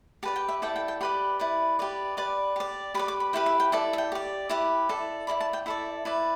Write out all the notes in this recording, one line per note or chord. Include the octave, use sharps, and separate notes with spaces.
G4 B4 D5 A5
G5
E5
E4 A4 D5 G5
G5
G5
G4 B4 D5 B5
E4 B4 D5
G4 B4 D5
G4 B4 D5 D6
G4 D5
G4 B4 D5 B5
D6
B5
E4 G4 B4 G5
E5
G5
E4 A4 D5 A5
E5
G5
G4 D5
E4 G4 B4 D6
E4 A4 D5
E4 A4 D5 B5
A5
G5
E4 A4 D5 E5
E4 B4 D5